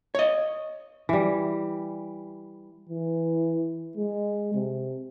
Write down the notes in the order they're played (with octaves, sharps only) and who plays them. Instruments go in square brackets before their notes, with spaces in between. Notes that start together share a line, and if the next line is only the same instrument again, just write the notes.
[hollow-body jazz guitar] C#5 D#5
[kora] E3 G3
[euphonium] E3
G#3
C3